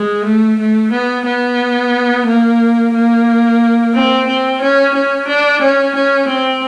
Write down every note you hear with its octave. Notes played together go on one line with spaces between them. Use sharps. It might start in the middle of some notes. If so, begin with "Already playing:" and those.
Already playing: G#3
A3
A3
B3
B3
A#3
A#3
C4
C4
C#4
C#4
D4
C#4
C#4
C4